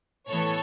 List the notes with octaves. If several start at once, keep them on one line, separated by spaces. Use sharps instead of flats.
A2 E3 B3 A4 C#5